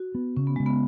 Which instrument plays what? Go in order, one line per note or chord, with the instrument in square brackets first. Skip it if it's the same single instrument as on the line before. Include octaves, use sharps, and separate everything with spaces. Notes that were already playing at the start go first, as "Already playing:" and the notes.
Already playing: [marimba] F#4
[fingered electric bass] B3
[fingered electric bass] C#3 [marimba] C#4
[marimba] B3
[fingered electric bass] C#3 [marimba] G#3
[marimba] B3